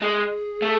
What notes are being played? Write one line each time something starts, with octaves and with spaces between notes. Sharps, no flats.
G#3 G#4
A3